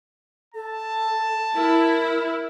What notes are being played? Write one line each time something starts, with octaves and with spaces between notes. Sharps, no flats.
A4 A5
E4 A#4